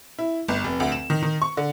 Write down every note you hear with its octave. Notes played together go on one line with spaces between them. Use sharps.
E4
G1
F1
D2
E7
D#3
D#3
C#6
D3